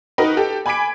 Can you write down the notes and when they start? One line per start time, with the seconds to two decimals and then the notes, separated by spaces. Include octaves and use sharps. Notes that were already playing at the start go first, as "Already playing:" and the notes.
0.18 D#4 F#4 A#4 B4 D#5
0.37 G4 A4
0.66 G#5 B5 D6 G#6 B6 D7